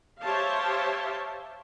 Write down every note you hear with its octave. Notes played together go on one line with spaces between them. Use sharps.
G4 C5 C#5 E5 F5 A5